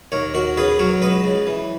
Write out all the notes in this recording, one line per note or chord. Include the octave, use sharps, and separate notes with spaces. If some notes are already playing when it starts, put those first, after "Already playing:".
D#2 A#4 C#5
D#2 F#4 A#4
C#3 G#4 B4
F#3 A#4 C#5
C#2 B4 D#5
C#3
E3